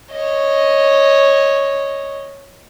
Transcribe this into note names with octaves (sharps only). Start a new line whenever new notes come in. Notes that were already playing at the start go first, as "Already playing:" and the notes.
C#5 D#5